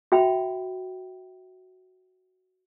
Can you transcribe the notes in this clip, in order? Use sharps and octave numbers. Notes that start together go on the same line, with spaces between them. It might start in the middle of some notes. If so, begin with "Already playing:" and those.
F#4 E5 G5 B5